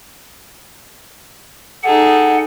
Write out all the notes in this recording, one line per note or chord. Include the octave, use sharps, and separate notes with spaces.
D#4 G#4 A4 F#5